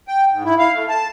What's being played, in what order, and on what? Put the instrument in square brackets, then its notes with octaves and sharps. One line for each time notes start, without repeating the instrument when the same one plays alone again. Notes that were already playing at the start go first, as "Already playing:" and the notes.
[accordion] G5
G#2
E4
F5
A3
A5